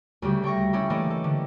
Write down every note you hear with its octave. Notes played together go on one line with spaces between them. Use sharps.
D2 C#3 G3 G4
A3 G5 C#6 A#6
C#4 D4 E4 G4
E3 A3 A#3 D4 A4 D#5
A4
D3